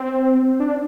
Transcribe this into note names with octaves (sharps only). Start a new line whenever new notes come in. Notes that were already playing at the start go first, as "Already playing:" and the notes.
Already playing: C4
D4